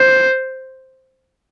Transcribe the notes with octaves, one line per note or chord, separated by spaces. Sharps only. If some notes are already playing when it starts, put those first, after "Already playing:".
Already playing: C5